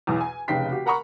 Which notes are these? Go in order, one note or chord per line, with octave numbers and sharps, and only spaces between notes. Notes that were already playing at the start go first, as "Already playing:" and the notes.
B1 E2
G#5
F1 C#3 D#4 G5 B6 C7
F#4 G4
A#4 F#5 A#5 B5 C#6